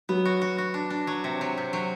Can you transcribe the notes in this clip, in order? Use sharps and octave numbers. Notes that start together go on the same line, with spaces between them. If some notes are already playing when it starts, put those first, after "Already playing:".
F#3 B3
F#4
F#4
F#4
D4
D4
F#3
C3
F#3
C3
F#3